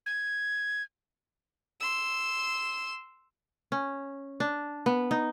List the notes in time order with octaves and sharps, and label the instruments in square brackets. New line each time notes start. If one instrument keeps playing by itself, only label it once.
[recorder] G#6
[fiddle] C6 E6
[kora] C#4
D4
B3
D#4